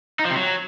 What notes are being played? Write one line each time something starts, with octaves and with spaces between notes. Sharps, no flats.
D#4
F3
C3
F#3